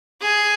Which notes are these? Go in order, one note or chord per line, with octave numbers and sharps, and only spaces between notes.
G#4